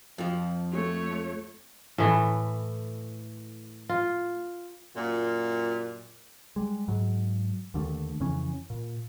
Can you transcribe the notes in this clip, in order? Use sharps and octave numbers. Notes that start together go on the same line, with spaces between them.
F2 F3
A3 C#5
A2 E3 A3
F4
F#2 A#2
G3 G#3
G#2 F#3
D#2 D3 F3 A3
F2 C#3 E3 C#4
A#2